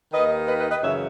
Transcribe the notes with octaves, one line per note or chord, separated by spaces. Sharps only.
D#2 D#3 B4 D#5
B4 D#5
B4 D#5
B4 D#5
F#2 C#3 E3 C#5 E5